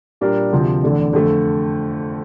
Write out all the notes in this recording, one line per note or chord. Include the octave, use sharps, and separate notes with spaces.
A#2 G3 D4 G4 A#4
D2 C3 F3
E2 D3 A3 D4
F2 D3 A3